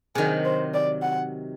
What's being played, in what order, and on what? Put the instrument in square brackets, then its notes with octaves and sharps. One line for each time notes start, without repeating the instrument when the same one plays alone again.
[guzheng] C3 D#3 F#3 [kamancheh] G#4
[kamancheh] C5
D5
F#5